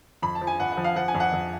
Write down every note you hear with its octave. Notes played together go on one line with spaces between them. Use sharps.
F2 B5
A5
F3
G#5
F2 F#5
F#5
F3
F5
F3 F#5
G#5
F2
F#5
F2